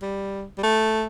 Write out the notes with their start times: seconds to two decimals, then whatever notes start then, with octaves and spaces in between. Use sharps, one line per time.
0.02 G3
0.58 G3
0.63 A3